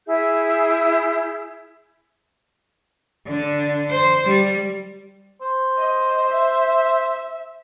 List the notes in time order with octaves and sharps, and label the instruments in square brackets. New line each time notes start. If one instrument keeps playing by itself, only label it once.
[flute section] E4 G#4 E5 G6
[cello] D3
C5
G3
[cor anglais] C5
[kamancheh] D#5
E5